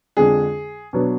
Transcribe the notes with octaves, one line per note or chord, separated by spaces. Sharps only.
F2 D3 G#3 D4 G#4
B2 F#3 B3 D4